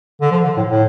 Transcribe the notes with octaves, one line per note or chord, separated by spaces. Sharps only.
D3
F3
D3
A2
A2